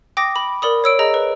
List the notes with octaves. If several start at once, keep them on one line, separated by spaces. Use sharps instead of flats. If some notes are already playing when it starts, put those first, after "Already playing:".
G5 D6 D#6 A#6
B5
A#4 D5 B5 D#6
C#5 E6 D7
G#4 D#5 A#5
B4